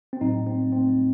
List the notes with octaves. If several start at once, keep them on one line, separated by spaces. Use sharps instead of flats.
C4
A2 F#3 A3 D#4
C4
A2 F#3 A3 C4